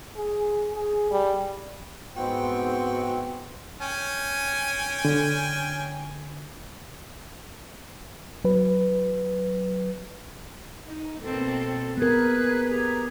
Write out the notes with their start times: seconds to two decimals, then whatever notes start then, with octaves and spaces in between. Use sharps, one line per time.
0.16 G#4
0.72 G#4
1.11 G3
2.16 G#2 B3 C4 F#4 G5
3.81 C#4 G5 G#5
5.05 D3
8.45 F#3 B4
10.87 D#4
11.20 B2 A#3 C4 A4
11.97 B3 G#4 A#4 B4 F#6
12.69 G4 G#4 A#5